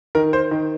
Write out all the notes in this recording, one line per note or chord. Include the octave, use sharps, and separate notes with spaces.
D#3 A#4
C5
D#3